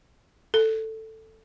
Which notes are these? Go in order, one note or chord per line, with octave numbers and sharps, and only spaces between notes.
A4